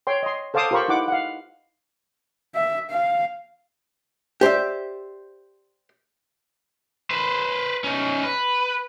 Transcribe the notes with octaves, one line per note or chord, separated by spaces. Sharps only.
C#5 G5 C6
D#5 C6
A4 C5 F5 A5 D6 D#6
F4 G4 A#4 C5 B5 C#6
D#4 E4 F#5 D6
F5 F#5
E5
F5
G4 C5 D5 E5
B4 C5
C#4 D#4
B4